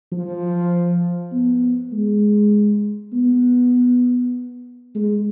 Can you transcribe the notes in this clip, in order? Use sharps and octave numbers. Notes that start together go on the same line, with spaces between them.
F3
B3
G#3
B3
G#3